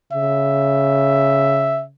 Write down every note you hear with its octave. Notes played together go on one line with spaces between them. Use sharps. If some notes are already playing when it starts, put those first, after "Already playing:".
C#3 E5